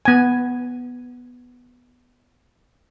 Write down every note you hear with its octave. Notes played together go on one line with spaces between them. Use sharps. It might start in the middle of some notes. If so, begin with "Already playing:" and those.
B3 G#5